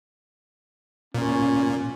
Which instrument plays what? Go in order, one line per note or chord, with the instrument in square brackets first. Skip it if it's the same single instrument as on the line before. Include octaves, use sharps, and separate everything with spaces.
[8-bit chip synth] A#2 [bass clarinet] C#4